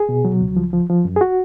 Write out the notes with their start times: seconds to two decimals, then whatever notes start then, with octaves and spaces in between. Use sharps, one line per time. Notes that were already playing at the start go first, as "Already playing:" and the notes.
Already playing: G#4
0.09 B2
0.25 F#3
0.41 C#2
0.57 F3
0.73 F3
0.89 F3
1.05 F#2
1.16 G#4
1.21 F#4